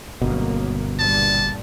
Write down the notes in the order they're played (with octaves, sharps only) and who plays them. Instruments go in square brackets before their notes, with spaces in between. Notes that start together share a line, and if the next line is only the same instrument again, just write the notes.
[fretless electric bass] G1 B2 [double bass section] C#2 F#2 A#3
[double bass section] G2 A#2 G3 [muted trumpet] A5